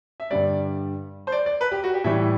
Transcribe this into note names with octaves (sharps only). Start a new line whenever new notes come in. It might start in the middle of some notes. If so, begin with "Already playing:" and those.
E5
G2 D3 G3 D5
C5
D5
D5
B4
G4
F#4
G4
A2 E3 G3 E5